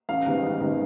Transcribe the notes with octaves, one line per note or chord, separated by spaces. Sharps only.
A1 F5
G#2 D#3 G3 B3
A1
G#2 D#3 G3 B3